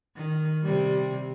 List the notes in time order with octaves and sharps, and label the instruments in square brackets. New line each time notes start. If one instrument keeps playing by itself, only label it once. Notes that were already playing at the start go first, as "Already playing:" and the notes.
[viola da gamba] D#3
C3 G3